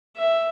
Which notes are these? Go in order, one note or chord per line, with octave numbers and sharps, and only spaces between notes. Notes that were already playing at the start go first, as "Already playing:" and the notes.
E5